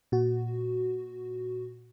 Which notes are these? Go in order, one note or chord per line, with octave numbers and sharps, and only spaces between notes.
A#2 F#4